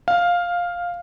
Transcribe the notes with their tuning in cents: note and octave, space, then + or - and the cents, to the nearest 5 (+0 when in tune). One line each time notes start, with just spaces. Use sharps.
F5 +10